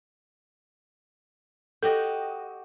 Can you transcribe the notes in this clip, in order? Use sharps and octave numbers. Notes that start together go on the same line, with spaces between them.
F#4 G4 A4 D#5